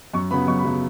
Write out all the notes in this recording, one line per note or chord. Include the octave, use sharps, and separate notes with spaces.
F#2 C#6
C#3 F#3 B3 B5
F#2 C#6
B5
C#3 F#3 B3